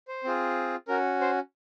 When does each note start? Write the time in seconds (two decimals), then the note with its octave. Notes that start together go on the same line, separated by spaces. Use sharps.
0.08 C5
0.24 C4 F4 G#4
0.88 C#4 F#4 A#4
1.21 C5